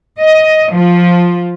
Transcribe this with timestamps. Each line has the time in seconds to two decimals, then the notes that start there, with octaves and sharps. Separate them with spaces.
0.17 D#5
0.71 F3